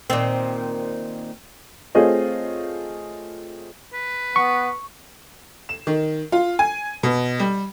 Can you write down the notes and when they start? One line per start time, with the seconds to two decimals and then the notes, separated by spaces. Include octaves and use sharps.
0.10 A#2 D#3 C4
1.95 A3 C4 F4 G#4 C#5 D#5
3.94 B4
4.36 B3 C#6
5.69 E7
5.87 D#3
6.32 F4
6.59 G#5
7.03 B2
7.40 G3